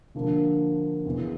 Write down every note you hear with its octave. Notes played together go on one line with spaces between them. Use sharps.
D3 F3 A#3 D4
E2 C#3 E3